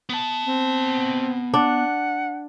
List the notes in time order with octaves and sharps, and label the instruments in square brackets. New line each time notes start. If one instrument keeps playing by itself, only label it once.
[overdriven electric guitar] B3 A5
[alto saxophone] C4
[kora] D4 [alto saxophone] F#5